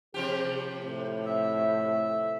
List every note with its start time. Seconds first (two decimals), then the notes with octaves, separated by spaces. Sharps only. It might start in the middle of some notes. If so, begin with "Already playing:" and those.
0.14 C3 F3 G4 G#4
0.79 A2
1.25 E5